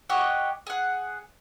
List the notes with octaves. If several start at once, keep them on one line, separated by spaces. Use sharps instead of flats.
G4 C#5 D#5 F#5
G#4 F#5